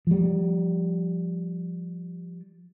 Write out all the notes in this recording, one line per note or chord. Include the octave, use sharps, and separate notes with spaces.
F3 G3